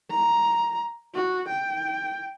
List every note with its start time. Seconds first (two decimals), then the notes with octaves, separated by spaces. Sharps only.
0.10 A#5
1.15 F#4
1.49 G5